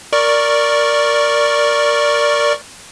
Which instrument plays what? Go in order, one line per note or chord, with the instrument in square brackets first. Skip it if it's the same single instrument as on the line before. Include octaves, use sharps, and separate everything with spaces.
[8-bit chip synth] A#4 D5 C#6